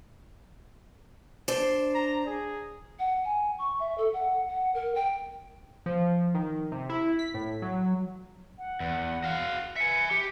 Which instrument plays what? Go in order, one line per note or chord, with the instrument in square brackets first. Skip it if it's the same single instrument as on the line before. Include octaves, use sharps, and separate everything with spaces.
[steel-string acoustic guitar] D4 C5
[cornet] A#5
G#4
[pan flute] F#5
G#5
C#6
E5
A4
F#5
F#5
A#4
G5
[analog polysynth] F3
D#3
C3
E4
B6
A2
F#3
[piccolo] F#5
[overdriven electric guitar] E2
F#4 F5
[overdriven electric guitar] E5 G#5 [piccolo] C#7
[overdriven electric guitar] G4